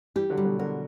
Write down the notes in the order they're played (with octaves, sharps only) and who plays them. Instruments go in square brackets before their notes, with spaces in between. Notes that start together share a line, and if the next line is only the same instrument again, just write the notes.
[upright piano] E3 G3 [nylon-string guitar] G4
[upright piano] D3 F#3
[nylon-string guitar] G3
[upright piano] B2 D3
[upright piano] B2 D3 [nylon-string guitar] A#4